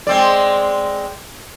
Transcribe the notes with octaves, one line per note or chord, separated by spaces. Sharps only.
G#3 C4 D5